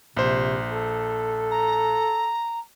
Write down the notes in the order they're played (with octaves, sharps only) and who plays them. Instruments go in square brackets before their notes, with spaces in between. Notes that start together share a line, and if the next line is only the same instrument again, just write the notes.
[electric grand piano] A#1 C5 [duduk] C3
[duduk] A4
[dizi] A#5